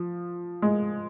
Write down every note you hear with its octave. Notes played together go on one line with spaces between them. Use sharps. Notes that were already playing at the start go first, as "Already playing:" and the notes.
Already playing: F3
G#3